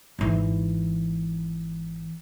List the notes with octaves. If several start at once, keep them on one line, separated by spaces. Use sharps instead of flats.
G#1 E3